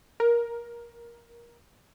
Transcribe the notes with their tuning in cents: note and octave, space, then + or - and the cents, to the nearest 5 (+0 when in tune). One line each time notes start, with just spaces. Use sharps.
A#4 +10